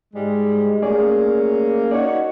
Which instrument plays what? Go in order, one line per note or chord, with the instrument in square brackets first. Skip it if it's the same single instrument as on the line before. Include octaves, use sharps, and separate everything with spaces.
[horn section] G#2 G3 G#3
[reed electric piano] A3 G#4 D5 [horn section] A#3 C#4
[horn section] D#4 F#4 C#5 [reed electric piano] D5